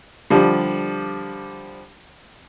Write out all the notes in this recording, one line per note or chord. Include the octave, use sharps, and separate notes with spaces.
D3 F3 G3